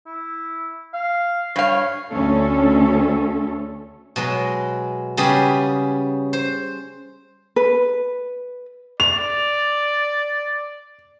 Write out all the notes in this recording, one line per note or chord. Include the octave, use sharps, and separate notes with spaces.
E4
F5
G2 C#5 F5
D2 C#4 A4
B2 F#3 G#3
C#3 G3 B3 G4 G#4
C5
B4
D5 F7